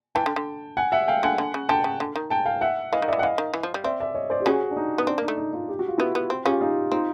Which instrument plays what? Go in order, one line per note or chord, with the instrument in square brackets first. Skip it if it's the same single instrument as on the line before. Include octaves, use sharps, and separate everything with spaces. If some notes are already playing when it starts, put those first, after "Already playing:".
[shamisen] E3 [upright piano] G5 A5
[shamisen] D3
D3
[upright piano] F#5 G#5
E5 F#5
F5 G5
[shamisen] D3 [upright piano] F#5 G#5
[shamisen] D3
C#3
[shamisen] D3 [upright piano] G5 A5
[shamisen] C#3
D3
D#3
[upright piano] G5 A5
F5 G5
E5 F#5
[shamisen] E3 [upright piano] D#5 F5
[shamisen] D#3
[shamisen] E3 [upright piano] D5 E5
[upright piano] F#5
[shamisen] E3 [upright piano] D#5 F5
[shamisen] D#3
E3
F3
G3
[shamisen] C4 [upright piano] D5 E5
[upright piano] D5 E5
C#5 D#5
C5 D5
G4
[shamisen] C#3 C#4 [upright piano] F#4 G#4
[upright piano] D4
D#4
[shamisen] B3
[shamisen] C4 [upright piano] D4
[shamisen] A#3 [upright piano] D#4
[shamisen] A3
[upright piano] D#4
D#4 F4
G4
F#4
F4
[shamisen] B3 [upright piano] E4 F#4
[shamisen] B3
C4
[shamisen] C#3 C#4 [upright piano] F4 G4
[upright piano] D#4 F4
[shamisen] C4 [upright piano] D#4 F4